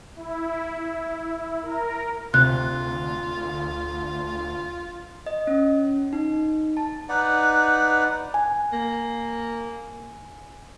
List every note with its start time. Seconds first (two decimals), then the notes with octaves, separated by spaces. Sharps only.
0.16 E4
1.62 A#4
2.34 D2 C3 F4 F#6
5.26 D#5
5.47 C#4
6.13 D#4
6.77 A5
7.09 D#4 B4 D5 F#5
8.34 G#5
8.73 A#3